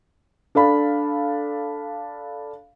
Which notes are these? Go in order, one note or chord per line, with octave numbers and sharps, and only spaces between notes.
D4 A4 F5 B5